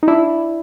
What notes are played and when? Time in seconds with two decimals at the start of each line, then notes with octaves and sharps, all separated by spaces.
0.03 D#4
0.08 D4 E4